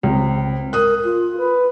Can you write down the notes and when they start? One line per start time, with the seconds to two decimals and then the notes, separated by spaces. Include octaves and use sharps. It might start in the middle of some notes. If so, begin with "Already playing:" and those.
0.03 C#2 C4
0.73 A#4 D#6 F#6
1.04 F4
1.37 B4